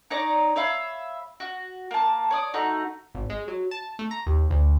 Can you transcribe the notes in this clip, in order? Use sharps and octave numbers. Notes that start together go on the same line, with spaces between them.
D#4 C#5 D5 A#5
C#5 E5 F5 B5
F#4
A#3 A5
C#5 D5 D#6
A3 D#4 F#4
G#1
G#3
F#3
A5
A3
A#5
D#2
D2